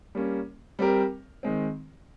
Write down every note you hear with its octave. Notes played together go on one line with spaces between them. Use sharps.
G3 A#3 C#4
G3 C4 G4 A#4
D#3 G#3 C4